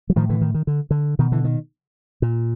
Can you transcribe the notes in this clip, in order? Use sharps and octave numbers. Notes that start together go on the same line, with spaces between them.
F#3
A2 D#3 F3
D3 E3
D#3
D#3
D3
D3
B2 D#3
D3 E3
D#3
A#2